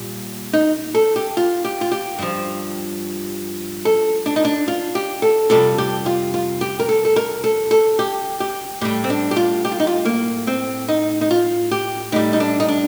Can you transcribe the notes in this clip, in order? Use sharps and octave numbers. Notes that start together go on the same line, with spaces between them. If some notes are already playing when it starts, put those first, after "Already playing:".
Already playing: A#2 G3
D#4
A4
G4
F4
G4
F4
G4
G2 F3
A4
D4
D#4
D4
F4
G4
A4
F2 C3 G3 A4
G4
F4
F4
G4
A#4
A4
A4
A#4
A4
A4
G4
G4
A2 G3 G4
C4
D4
G4
F4
G4
F4
D#4
F4
A#3
C4
D#4
D#4
F4
G4
A2 G3 D#4
D#4
D4
D#4
D4